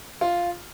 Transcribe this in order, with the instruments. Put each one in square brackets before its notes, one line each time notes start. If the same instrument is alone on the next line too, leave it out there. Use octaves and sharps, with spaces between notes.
[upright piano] F4